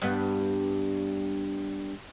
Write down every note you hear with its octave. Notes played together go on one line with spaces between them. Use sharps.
G2 B3